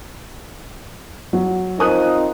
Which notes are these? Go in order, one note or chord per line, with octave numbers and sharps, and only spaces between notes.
F#3
F3 C4 D#4 A#4 D#6 F#6